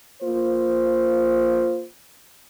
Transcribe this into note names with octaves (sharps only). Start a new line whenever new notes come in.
A#3 F4 C5